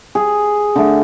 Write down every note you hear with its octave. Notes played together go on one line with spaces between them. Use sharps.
G#4
D3 A3